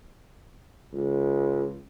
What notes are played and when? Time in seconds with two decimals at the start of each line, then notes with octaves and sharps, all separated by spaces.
0.93 C#2